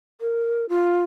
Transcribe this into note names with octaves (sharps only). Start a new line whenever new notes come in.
A#4
F4